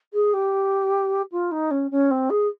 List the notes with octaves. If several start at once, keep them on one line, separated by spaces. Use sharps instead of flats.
G#4
G4
F4
D#4
C#4
C#4
C4
G#4